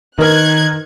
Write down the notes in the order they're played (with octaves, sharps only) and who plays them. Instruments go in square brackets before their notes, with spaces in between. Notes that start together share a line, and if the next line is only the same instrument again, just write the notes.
[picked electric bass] D#3 [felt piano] A#4 B4 F6 [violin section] F#6 G#6